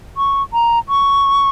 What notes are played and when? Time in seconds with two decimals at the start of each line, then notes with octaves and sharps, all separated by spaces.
0.17 C#6
0.53 A#5
0.89 C#6